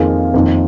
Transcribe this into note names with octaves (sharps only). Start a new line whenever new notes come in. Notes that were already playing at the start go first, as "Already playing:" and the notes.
Already playing: F2 D#3 A#3 F4 G#4
F2 D#3 A#3